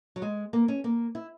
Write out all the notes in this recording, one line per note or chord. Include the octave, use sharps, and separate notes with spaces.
F#3
G#3
A#3
C#4
A#3
E4